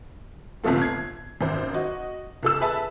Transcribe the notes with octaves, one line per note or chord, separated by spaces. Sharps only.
G1 C#2 C3 F3 A3 C4
G#6 C7
G#1 F#2 C5
F#4 D#5
C#2 A4 E6
G#4 B4 E5 A5